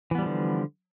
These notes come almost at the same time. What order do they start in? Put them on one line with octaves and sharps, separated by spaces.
E3 B3 G3 F3 D3